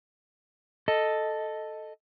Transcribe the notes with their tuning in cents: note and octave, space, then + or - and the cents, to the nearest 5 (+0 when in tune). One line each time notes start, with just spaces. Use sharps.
A4 +0 D#5 +0